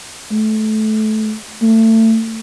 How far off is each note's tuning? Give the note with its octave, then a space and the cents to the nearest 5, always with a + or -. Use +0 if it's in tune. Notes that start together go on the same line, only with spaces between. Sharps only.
A3 -25
A3 +25